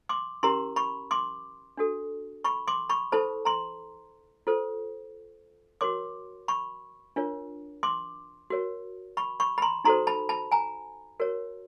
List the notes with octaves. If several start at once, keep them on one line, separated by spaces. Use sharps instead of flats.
C6 D6
C#4 E4 G4 A#4 A#5 C6
B5 C#6
C6 D6
D4 F#4 A4
B5 C#6
C6 D6
B5 C#6
E4 A4 C5 A5 B5
A#5 C6
F4 A4 C5
F#4 A#4 C#5 C6 D6
B5 C#6
D4 F4 A#4 C#5
C6 D6
F#4 A#4 C#5
B5 C#6
B5 C#6
B5
A#5 C6
D#4 F#4 A4 C5 A#5 C6
A5 B5
A5 B5
G#5 A#5
F#4 A#4 C#5